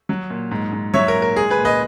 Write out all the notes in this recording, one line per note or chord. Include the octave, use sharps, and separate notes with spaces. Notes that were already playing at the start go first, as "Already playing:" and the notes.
F#3
A#2
G#2
G#2
F#3 C#5 E5
A#4
A#2
A#4
G#3 G#4
G#4 B4
A#2
B4 D#5